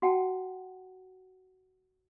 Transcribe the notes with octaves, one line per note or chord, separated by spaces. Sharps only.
F#4 F#5 G5 A5